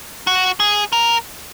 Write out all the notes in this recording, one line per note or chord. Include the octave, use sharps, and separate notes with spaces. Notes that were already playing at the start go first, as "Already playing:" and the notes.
F#4
G#4
A#4